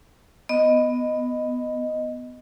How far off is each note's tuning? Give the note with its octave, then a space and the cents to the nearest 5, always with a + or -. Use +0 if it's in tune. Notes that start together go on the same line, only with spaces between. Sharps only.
B3 +10 D#5 +0